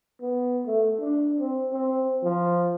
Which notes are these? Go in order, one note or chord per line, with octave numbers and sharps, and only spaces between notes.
B3
A3
D4
C4
C4
F3